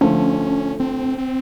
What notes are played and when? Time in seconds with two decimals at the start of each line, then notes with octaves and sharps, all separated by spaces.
0.01 D3 F3 A3 C#4
0.80 C4
1.18 C4